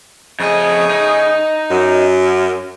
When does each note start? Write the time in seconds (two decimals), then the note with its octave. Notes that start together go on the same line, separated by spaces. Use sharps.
0.40 F2 C#3 A3 G#4 D#5
0.90 D#4
1.69 F#2